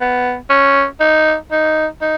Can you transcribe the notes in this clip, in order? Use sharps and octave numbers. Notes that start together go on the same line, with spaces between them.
B3
C#4
D#4
D#4
D#4